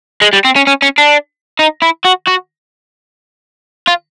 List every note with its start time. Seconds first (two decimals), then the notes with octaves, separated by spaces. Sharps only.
0.21 G#3
0.33 G3
0.45 C4
0.56 C#4
0.67 C#4
0.82 C#4
0.98 D4
1.59 D#4
1.82 E4
2.05 F#4
2.27 F#4
3.87 F4